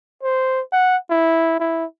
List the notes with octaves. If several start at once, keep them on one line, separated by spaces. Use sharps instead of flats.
C5
F#5
E4
E4